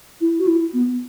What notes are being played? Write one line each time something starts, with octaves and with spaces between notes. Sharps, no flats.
E4
F#4
E4
B3